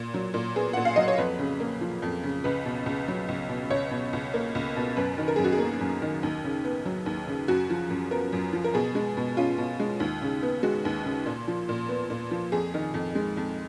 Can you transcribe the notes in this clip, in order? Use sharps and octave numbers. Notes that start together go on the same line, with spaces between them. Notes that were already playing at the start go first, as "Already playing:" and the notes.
Already playing: A#2
F#3
A#2
B3 G#4
A#2 F#5
F5
F#3 D#5
C#5
F2 B4
C#3
A#3
F3
F2
C#3
C#2 B4
B2
C#2
F#3
C#2
B2
C#2 C#5
B2
C#2
A#3
C#2
B2
F#2 B4
D#3
A#4
F#2 G#4
F#4
G#4
A#3
F#2
D#3
D#2
C#3
B3
F#3
D#2
C#3
F#2 F#4
F3
F#2
B3 A#4
F#2
F3
A#4
B2 G#4
G#3
B2
C#4 F4
B2
G#3
D#2
C#3
B3
G#3 F#4
D#2
C#3
A#2
F3
A#2
B3
A#2
F3
F2 G#4
D#3
F2
G#3
F2